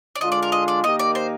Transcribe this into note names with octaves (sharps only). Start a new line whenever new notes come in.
D5
D3 G#3 D4 F4 D#5
D5
A#4
D#5
D5
D#3 A#3 D#4 G4 D#5
D5
C5